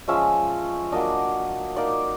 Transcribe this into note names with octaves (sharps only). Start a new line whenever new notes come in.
F3 G#3 C#4 E5
F#3 A#3 D4 D#5
A#3 D#4 D5